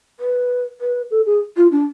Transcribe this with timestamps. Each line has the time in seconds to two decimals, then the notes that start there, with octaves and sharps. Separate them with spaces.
0.20 B4
0.81 B4
1.11 A4
1.26 G#4
1.57 F4
1.72 D4